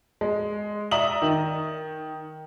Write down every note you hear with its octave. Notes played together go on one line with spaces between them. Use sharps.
G#3
D5 E5 A#5 D#6 F#7
D#3